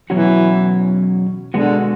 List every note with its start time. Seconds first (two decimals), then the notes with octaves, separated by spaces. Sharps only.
0.10 E2 B2 E3 F#3 C#4 F#4
1.54 B2 D3 G#3 B3 F#4